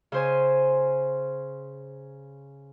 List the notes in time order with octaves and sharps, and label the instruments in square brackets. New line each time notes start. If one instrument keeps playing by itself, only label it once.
[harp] C#3 C5 G#5